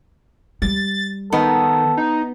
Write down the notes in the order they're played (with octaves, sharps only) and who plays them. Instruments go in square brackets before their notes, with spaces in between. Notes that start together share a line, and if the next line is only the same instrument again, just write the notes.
[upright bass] G3 [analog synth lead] A6
[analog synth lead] D#3 [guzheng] B3 [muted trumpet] A4
[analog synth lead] D#4